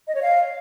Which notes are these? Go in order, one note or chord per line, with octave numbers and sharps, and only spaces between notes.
D#5
C#5
F5